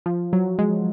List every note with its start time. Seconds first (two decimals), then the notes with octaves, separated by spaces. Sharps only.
0.06 F3
0.33 F#3
0.59 G#3